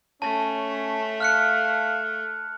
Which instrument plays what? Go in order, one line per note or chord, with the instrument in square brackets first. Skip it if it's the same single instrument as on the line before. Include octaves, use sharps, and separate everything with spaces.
[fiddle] A3 [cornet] C#4 [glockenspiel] A5
[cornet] F5 [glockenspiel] F6 F#6 C#7